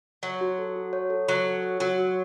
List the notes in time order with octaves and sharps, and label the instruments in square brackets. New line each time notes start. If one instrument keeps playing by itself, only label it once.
[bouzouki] F#3 [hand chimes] C#5
[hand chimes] F#4
A4
F#4
C#5
A4
[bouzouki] F#3 [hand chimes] C#5
[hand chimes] A4
C#5
[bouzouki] F#3 [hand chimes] F#4
[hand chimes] F#4